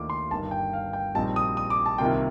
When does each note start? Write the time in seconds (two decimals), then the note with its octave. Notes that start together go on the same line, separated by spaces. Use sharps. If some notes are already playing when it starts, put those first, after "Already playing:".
Already playing: D#2 D#3 A3 D4 F4 D6
0.10 C6
0.31 G1 G2 D#3 A5
0.51 G5
0.73 F5
0.93 G5
1.15 A#1 A#2 G3 C4 D#4 A5
1.36 D#6
1.57 D#6
1.70 D6
1.86 A5
1.98 C2 C3 D#3 A#3 F4 G5